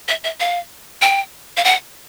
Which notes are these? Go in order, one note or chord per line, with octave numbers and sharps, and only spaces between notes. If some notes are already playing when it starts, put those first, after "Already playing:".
E5
E5
F5
G5
F5
F#5